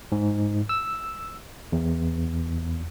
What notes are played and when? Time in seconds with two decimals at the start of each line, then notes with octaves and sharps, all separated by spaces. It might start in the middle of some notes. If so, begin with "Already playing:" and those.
0.12 G#2
0.69 E6
1.72 E2